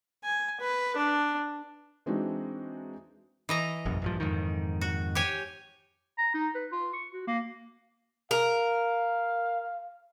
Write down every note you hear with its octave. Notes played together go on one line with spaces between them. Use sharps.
G#5
B4
D4
E3 G#3 C4 D4 D#4 F#4
E3 D#5 A#5
F1 A#1 F#2
A#1 G2 F3
F2 G#2 D#3
F#4
G4 C#5 G#5
A#5
D#4
B4
F4
C#6
F#4
A#3
A#4 F5